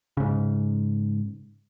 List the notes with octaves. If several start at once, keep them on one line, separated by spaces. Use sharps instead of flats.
G#2 C#3